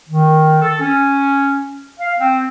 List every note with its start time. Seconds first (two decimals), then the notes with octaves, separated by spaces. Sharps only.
0.08 D#3
0.62 A4
0.81 C#4
2.00 F5
2.19 C4